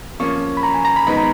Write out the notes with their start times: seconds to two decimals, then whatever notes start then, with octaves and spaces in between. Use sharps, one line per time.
0.20 F3 A#3 C#4 C#6
0.57 B5
0.63 A#5
0.74 G#5
0.85 A#5
0.96 B5
1.07 G#2 D#3 G#3 B3 D#4 B5
1.17 A#5